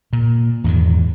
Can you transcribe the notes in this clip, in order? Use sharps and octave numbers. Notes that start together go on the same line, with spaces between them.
A#2
E2 G#2 D#3